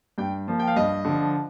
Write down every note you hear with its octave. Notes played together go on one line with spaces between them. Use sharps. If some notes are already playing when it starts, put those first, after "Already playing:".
G2 G5
F3 A#3
G5
F5
G2 D#5
D3 F3